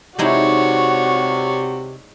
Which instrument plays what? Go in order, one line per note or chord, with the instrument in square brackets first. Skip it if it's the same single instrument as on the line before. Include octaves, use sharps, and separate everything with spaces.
[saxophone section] C3 [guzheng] G#3 D#4 E4 [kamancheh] F#4 [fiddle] C#5 D5